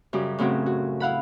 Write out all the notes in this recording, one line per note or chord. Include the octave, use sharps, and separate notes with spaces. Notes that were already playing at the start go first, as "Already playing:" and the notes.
F#2 C#3 G3
A2 C#3 C4 F#4
F#4
E4 F5 F#5 B5